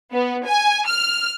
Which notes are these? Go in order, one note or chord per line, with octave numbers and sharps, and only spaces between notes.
B3
G#5
F6